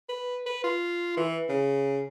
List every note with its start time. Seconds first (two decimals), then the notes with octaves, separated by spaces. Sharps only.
0.09 B4
0.46 B4
0.64 F4
1.17 E3
1.49 C#3